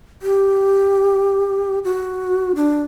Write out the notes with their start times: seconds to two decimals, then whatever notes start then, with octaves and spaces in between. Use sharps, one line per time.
0.22 G4
1.84 F#4
2.56 D4